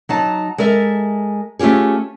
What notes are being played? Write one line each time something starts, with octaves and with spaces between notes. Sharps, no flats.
F#3 D#4 A5
G#3 A4 A#4 E5
A3 C#4 F4 G4 G#4